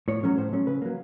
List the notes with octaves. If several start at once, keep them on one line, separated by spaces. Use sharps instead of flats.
A2 C#5
F#3 A3 C#4
A2 C5
F#3 A3 C#4
C#3 B4
F#3 A#3